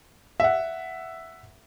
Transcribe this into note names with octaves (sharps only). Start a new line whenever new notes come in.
E5 F#5